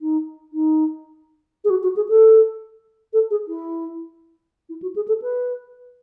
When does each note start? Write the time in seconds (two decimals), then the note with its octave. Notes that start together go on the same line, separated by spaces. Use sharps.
0.01 D#4
0.53 D#4
1.64 G#4
1.70 F#4
1.83 F#4
1.96 G#4
2.09 A4
3.13 A4
3.31 G#4
3.48 E4
4.69 E4
4.82 F#4
4.96 G#4
5.08 A4
5.22 B4